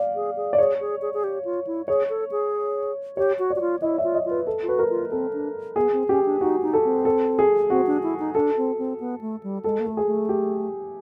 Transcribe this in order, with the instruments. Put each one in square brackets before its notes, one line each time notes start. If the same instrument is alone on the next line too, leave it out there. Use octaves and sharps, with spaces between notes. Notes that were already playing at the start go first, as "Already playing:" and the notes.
Already playing: [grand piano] D5 F5
[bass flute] G#4
G#4
[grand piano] D5
[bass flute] G#4 [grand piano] C#5
[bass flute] G#4
G#4
G#4
G4
F4
E4
[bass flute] G#4 [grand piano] C#5
[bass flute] A4
G#4
[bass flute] G4 [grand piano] C#5
[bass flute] F#4
[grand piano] D5
[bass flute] F#4
F4
[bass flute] E4 [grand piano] D#5
[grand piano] E5
[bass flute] F4
[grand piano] D#5
[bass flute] F4
[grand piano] B4
A4
[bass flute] F4
[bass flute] F#4 [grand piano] B4
[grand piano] A#4
[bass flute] F4
[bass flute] C4 [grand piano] A4
[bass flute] D4
[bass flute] B3 [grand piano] G#4
[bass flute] C4
[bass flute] C#4 [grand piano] G4
[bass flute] D4
[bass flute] D#4 [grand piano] F#4
[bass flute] D#4
[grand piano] A4
[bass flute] C4
[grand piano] A4
G#4
[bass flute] C4 [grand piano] F#4
[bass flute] D4
E4
D#4
[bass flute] D4 [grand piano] A4
[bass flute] C4
C4
B3
A3
G3
[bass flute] G#3 [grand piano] A4
[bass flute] A#3
[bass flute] A3 [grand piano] A4
[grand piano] G#4
[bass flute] A3
[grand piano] G4